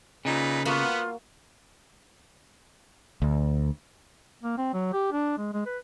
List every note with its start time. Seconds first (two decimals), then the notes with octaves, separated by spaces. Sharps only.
0.25 A#2 C#3 D#4 B4
0.65 A#3 B3 F4 F#4
3.22 D2
4.43 A#3
4.58 C4
4.73 F#3
4.93 G4
5.12 D4
5.38 G#3
5.53 G#3
5.66 B4